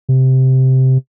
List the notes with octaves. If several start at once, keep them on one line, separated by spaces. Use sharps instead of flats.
C3